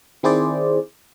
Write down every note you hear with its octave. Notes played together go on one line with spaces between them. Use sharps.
D#3 C4 E4 G#4 C5 D5